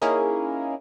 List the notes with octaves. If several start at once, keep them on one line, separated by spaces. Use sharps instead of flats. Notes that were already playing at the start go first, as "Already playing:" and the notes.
A#3 C#4 D#4 E4 G#4 A#4